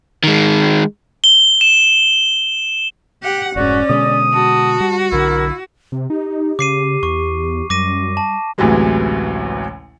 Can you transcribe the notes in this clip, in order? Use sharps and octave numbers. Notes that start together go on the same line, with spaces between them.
D#3 G#3
G7
E7
G4 F#5
F1 G#2 C#4 F#4 D5
B2 D3 G#3 D#6
F#4 A5
G3
B1 D3 E4 A#4
C3
D#4 G4
C#3 D6 C7 D#7
E2 C#6
F#2 G3 D6 A#6 D#7
A5
A1 D2 C3 E3 F#3 G#3